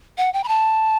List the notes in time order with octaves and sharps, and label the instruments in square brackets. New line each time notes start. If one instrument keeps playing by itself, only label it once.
[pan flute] F#5
G5
B5
A5